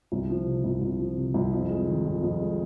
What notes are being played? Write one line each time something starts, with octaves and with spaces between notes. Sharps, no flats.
C2
F3
C3
C2
C2
F3
C3
C2
F2
G#3
D#3
F2
F2
G#3